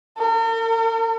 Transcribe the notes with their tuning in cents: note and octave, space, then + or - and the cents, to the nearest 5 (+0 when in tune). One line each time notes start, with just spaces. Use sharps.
A#4 -45